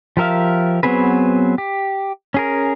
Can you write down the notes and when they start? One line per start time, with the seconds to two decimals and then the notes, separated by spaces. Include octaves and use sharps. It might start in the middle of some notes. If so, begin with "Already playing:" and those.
0.17 F3 G4 A#4 E5 F5
0.83 F#3 B3 C4 G#4 B4
1.58 G4
2.34 C#4 G#4 A#4